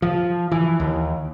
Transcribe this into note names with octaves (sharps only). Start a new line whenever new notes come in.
F3
E3
D#2